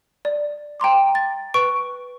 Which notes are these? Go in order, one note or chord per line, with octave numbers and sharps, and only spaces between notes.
D5
G5 A#5 C6 D6
A6
B4 C#6 D7